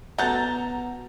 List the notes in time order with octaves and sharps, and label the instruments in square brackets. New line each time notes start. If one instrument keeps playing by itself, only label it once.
[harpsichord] B2 [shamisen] F#3 C#4 A4 [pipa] F#5 [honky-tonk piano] A#5 G6 A6